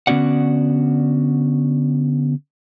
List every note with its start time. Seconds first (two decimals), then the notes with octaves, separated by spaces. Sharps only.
0.07 D3 B3 C#4 F#4 D5 F#5